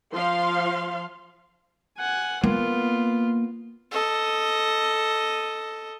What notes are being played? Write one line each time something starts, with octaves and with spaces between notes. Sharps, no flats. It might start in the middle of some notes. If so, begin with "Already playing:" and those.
F3 F5 C6
F#5 G#5
A#3 B3 F4
A4 D#5